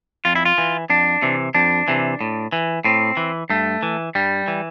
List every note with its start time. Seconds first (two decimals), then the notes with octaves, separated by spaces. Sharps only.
0.25 F2 F4
0.35 E4
0.45 F4
0.58 E3
0.90 F2 D4
1.22 C3 E3
1.55 F2 D4
1.88 C3 E3
2.21 A2
2.52 E3
2.84 A2 C4
3.17 E3
3.50 G2 A3
3.83 E3
4.15 G2 G3
4.48 E3